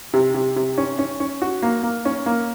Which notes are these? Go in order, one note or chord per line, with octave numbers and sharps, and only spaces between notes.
C3
C3
C3
C#4
C#4
C#4
F#4
A#3
A#3
C#4
A#3